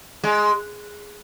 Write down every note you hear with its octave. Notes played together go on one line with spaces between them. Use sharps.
G#3